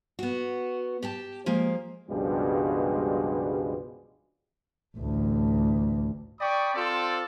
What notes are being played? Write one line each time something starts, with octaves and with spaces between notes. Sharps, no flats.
B3 F#4
G4 G5 A5
F3 G#3 A#3
C#2 G2 B2 F3 G3 G#3
A1 D2
D5 G5 B5 C#6 D#6
C4 F4 A4 C5 D5